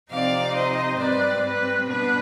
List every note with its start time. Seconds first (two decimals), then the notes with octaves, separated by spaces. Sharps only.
0.11 C3 F3 C4 D#4 D5 F5
0.55 C5 D#5
0.99 G#2 G3 C4 B4 D5
1.44 B4
1.87 B2 B3 D4 B4